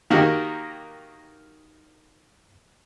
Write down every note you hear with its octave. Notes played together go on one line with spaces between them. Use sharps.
D#3 A#3 D#4 F#4 G4 A#4